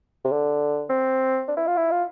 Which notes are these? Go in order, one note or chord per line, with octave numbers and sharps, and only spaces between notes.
C3
D3
C4
D4
E4
F4
E4
F4